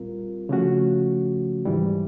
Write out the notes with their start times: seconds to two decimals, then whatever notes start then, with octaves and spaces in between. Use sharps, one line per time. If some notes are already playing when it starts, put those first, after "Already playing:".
Already playing: A#2 G3 C4 F4 A#4
0.49 C#3 F3 A3 C#4 F#4
1.66 G#2 E3 G3